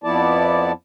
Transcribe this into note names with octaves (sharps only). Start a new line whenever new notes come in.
F2 F3 B3 E4 D5 A5